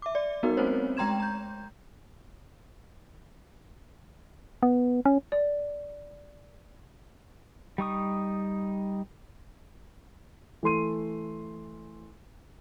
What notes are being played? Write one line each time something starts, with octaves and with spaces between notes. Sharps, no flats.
E5 D6
D5
G3 B3 D#4 F#4 A#4
A3 C4 C#4 A#4 C5 C#5
G#3 G5 A#5 C6 G#6 E7
A#5 G6
B3
C#4
D5
G3 D#4 C#6 D#6
E3 A3 C6 D#7